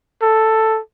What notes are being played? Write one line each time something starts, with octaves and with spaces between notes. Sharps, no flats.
A4